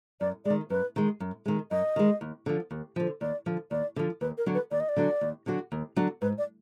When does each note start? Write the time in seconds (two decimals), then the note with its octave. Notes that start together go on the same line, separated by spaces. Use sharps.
0.21 F#2 D5
0.45 D#3 G#3 D5
0.70 F#2 B4
0.96 D#3 G#3
1.20 F#2
1.46 D#3 G#3
1.71 F#2 D#5
1.96 D#3 G#3
2.21 D#2
2.46 D3 F3
2.71 D#2
2.96 D3 F3
3.21 D#2 D5
3.46 D3 F3
3.71 D#2 D5
3.96 D3 F3
4.21 D#2 B4
4.38 A#4
4.46 D3 F#3 D4 F#4
4.55 B4
4.71 D#2 D5
4.80 D#5
4.89 D5
4.96 D3 F#3 D4 F#4
5.21 D#2
5.46 D3 F#3 D4 F#4
5.72 D#2
5.96 D3 F#3 D4 F#4
6.22 G#2 B4
6.38 D5